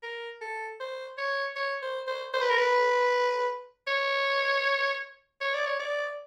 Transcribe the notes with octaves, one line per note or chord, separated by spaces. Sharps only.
A#4
A4
C5
C#5
C#5
C5
C5
C5
B4
A#4
B4
C#5
C#5
D5
C#5
D5